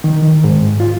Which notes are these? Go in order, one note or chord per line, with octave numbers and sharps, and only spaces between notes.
D#3
D#3
G#2
F4